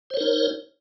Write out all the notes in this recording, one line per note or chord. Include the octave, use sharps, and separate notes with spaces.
D#4 A#4 C5 C#5